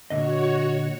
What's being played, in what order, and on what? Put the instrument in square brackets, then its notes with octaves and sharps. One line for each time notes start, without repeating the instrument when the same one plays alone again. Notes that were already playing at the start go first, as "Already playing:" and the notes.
[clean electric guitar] A#2 D3 D#5 [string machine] F#4 C#5